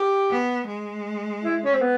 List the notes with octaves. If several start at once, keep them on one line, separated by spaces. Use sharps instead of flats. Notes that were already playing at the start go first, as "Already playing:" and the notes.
Already playing: G4
B3
G#3
E4
C#4
C4
B3